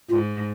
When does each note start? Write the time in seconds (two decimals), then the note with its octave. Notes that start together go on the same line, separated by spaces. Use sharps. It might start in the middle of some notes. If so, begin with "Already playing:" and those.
0.09 G#2 F4